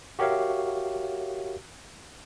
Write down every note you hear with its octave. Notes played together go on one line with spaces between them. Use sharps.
F#4 G4 A#4 C#5 E5 F5